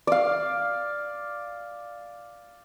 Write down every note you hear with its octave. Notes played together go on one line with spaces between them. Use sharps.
D5 F5